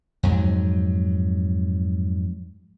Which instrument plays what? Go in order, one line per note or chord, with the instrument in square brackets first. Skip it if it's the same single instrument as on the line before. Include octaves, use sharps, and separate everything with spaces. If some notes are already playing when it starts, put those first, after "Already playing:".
[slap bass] F2 G#2 F#3